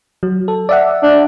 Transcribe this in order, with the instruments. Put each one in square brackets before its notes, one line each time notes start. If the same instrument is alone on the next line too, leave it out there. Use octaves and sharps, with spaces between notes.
[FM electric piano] F#3
A4
D5 E5 F#5
[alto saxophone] D4